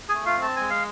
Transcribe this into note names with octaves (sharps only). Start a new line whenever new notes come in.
G#4 G#5
A3
F4 F5
C4
A5
G#3 G#5
F5